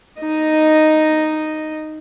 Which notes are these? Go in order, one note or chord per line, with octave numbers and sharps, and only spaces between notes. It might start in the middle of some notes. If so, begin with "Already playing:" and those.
D#4 D#5